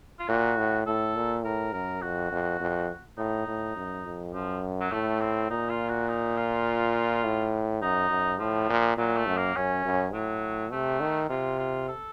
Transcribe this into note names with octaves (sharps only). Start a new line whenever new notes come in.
F4
A#2 F#4
A2
A2 A4
A#2
A2 A#4
F#2 A#4
F2 F#4
F2
F2
A2 D#4
A2
F#2
F2
F#2 F3
F#3
A2 A3
C4
A#2 D#4
F4
F#4
D#4
F4
A2
F#2 D#4
F#2
A2 F3
A#2
A#2 F#3
A3
F#2
A#3
F#2 C#4
F#2
A2 F#3
C3 A3
D#3
C3 F4
F4
A4